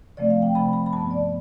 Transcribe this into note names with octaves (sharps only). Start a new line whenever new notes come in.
C3 F3 A3 C4 D5
F5
G5
C3 F3 A3 C4 B5
B5
B5
G2 F3 B3 A5
D5